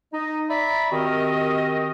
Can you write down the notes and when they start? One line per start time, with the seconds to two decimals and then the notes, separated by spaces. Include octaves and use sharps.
0.13 D#4 D#5
0.49 D5 E5 A#5 B5
0.91 D#3 C4 F#4 G4 A#4 D#5